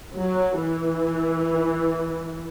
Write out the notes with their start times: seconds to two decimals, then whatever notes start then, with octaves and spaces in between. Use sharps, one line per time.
0.16 F#3
0.61 E3